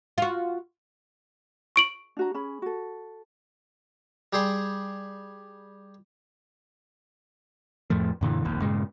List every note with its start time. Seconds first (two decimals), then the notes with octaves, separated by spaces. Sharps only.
0.18 F4 F#4
1.76 C#6 D7 F#7
2.17 D4 F#4 A#5
2.34 C#4 G#4 B5
2.62 F#4 A4
4.33 G3 G4 G#4 C6
7.90 F2 A2 F3 A3
8.21 F#2 A#2 D3 E3
8.45 F1 A#1 D#2
8.62 G2 A#2 C#3 G#3